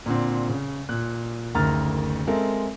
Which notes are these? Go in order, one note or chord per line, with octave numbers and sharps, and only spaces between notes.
A#2 D3 C4
C#3
A#2 F#6
F#1 D2 D#3 A#5 F6 A6
G#3 C4 A4 A#4 E5